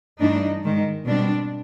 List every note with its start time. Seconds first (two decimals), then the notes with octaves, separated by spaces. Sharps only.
0.20 G2 E3 A3 D4 D#4
0.63 G#2 D#3 G#3
1.06 B2 G3 C4 D4